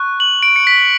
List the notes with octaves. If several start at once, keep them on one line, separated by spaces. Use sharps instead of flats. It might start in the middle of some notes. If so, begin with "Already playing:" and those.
Already playing: C#6 F#6
F#7
D7
C#7
B6